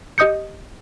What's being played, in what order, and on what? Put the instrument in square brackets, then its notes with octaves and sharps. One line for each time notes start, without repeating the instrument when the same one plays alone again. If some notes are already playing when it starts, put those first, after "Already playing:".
[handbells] G4 D#5 D#6 G6 C#7